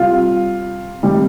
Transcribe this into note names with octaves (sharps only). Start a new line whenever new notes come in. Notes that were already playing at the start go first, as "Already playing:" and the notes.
Already playing: C3 G3 F4 F5
C3 D#3 G3